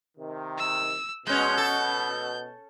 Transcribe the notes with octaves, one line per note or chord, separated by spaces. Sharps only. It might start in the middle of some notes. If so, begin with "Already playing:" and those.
C3 D#3
E6
B2 G#3 C#4 G6
A4